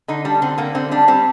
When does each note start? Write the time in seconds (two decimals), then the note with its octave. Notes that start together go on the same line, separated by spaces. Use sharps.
0.08 D3 D#4
0.25 G3 D4
0.42 D3 C4
0.58 D3 A#3
0.75 D3 C4
0.91 G3 D4
1.08 G3 C4